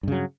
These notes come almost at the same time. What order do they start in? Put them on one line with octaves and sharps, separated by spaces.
G2 C#3 F#3